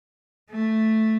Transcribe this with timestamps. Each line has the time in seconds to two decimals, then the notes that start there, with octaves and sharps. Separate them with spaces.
0.50 A3